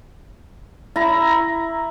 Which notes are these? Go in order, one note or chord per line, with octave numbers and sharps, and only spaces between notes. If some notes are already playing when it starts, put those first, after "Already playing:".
E4 A#5